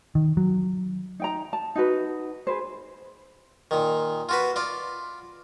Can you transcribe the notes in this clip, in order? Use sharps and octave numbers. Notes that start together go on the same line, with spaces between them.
D#3
F#3
D#4 G5 A#5
A5
D#4 F#4 B4
G#4 B4 C5
A#2 D#3
F4 F#4 B4
F4 D5